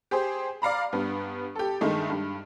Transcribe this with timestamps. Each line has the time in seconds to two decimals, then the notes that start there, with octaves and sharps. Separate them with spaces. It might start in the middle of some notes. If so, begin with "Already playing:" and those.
0.11 G4 G#4 C5
0.62 D5 F5 A#5 B5
0.93 G2 B3
1.55 G4 A4
1.81 G2 D#3 G#3 A3 D#4
2.10 G2